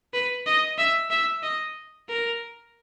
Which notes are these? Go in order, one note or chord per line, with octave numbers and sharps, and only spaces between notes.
B4
D#5
E5
E5
D#5
A#4